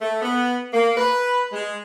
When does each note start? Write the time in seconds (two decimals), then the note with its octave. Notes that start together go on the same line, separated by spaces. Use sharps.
0.02 A3
0.22 B3
0.73 A#3
0.97 B4
1.53 G#3